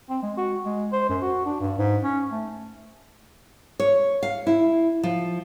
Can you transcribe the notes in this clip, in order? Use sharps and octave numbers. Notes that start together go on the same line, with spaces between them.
C4
G#3
F#4
G#3
C5
F#2
F#4
D4
G2
G#2
C#4
A3
C#5
F5
E4
F3